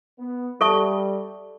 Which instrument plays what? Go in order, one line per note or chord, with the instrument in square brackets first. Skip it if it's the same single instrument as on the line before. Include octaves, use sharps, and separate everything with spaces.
[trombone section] B3
[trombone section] G3 [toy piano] A4 E5 A5 C#6